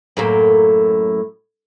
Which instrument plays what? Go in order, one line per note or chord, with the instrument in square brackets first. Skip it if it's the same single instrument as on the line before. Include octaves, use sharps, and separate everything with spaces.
[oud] F#2 A2 A#3